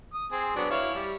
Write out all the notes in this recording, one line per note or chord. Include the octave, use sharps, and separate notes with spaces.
D#6
C4 G#4
F#3 B3 D4
E4 C#5 F5
G3